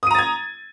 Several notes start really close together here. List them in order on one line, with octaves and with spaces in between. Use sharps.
D#6 D#7 A#5 A6 G#6